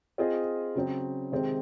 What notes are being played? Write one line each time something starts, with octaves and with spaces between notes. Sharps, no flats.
C4 F4 G#4 D#5
C#3 F#3 C4
C3 D#3 G#3 C4